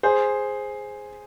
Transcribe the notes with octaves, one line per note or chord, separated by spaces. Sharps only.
G#4 C5